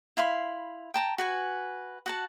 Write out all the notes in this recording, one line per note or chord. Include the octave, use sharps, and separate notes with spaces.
E4 F5 B5 C6
G5 A5 A#5
F#4 B4 G#5
F#4 F#5 A5